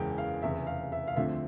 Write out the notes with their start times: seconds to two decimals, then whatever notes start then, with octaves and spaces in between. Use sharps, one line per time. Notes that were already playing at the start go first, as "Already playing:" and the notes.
Already playing: F#1 E2 C#3 E3 G#3 G5
0.18 F5
0.42 F1 E2 C#3 E5
0.67 F5
0.92 E5
1.07 F5
1.16 D2 D3 F3 A3 C4 E5